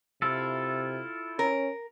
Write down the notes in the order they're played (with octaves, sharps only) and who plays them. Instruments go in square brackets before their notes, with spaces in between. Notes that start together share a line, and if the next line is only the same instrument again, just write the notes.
[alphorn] C3 [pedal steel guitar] E4 F4 A4
[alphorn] C#4 [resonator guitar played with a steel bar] A#4